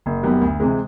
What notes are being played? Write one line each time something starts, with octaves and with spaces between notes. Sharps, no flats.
F#1
F#2 D#3 G3 B3
D2
C3 E3 G#3